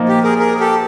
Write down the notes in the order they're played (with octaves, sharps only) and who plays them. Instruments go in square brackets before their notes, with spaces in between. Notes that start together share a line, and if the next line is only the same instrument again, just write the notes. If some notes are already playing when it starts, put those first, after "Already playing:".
Already playing: [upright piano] A#2 F3 A#3 D#4
[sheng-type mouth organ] G4
G#4 A#4
G#4 A#4
G4 A4